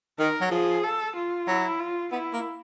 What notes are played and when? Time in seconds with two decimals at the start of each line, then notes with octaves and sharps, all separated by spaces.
0.19 D#3 A#4
0.41 F#3
0.51 F3 G#4
0.84 A4
1.16 F4
1.47 F#3 E4
1.79 F4
2.12 B3 E4
2.33 A#3